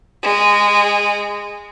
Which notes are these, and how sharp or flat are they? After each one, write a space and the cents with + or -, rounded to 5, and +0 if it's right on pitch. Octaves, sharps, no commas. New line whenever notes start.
G#3 -15